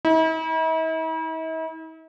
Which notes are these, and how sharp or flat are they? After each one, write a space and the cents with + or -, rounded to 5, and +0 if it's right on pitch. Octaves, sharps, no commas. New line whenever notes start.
E4 -45